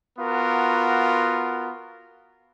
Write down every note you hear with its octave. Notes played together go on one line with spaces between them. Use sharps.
B3 F4 F#4 A#4